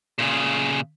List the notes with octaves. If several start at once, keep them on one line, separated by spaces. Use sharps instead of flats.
A#2 C#3